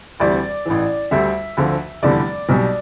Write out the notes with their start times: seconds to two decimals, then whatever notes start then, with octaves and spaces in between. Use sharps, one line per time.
0.20 D2 C3 E3 G3 D5
0.66 A1 A2 E3
1.11 D2 D3 G3 E5
1.57 D2 D3 F3
2.02 F1 E2 D3 G3 D5
2.49 B1 B2 G3